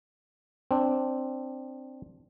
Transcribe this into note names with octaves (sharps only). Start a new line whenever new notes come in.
C4 D4